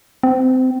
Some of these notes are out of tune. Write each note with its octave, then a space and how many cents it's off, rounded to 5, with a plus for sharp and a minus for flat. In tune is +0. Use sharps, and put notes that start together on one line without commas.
C4 -25